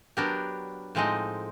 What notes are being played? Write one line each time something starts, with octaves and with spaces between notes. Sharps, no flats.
F#3 B3 D4 G4 A#4
A2 F3 G#3 C4 D#4